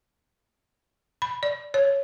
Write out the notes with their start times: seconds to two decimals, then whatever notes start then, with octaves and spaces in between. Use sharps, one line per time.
1.22 B5
1.43 D5
1.74 C#5